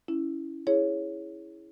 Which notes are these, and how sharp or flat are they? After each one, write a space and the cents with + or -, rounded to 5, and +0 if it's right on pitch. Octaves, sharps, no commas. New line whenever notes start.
C#4 +15 E4 +0
E4 +0 G#4 +0 C#5 +0